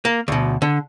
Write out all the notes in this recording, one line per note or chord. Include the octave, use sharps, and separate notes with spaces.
A#3
D2 B2
D3